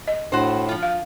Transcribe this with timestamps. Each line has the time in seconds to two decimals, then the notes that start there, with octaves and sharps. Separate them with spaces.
0.08 D#5
0.32 A2 D4 F#4 C5
0.69 F3 F4
0.83 F5